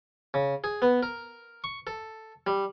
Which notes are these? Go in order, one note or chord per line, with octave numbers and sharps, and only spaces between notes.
C#3
G#4
B3
A#4
C#6
A4
G3